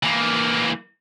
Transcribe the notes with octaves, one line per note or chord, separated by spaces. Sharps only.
E3 A#3